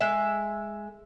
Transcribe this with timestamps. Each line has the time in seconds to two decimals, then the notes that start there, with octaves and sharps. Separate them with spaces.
0.01 G#3 E5